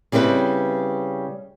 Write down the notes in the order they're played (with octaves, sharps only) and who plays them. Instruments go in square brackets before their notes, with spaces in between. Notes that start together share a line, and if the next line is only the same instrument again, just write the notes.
[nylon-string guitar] C#3 G3 C4 E4 B4